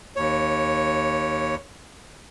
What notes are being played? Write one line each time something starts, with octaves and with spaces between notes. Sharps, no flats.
D#2 C#5